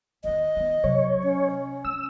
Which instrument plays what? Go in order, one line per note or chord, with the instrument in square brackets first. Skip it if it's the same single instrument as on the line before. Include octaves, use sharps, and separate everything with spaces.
[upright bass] E2 D#3 [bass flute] D#5
[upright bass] D#3 B3
[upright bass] C3 F#3 [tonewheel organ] C#5
[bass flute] C#4
[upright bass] G#3 [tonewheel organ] E6